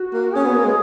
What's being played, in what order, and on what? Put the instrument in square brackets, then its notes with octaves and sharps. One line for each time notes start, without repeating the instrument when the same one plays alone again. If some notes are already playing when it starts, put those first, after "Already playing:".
Already playing: [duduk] F#4
[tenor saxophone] A#3
[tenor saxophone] C#4 [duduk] G#4
[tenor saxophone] B3
A#3
G#3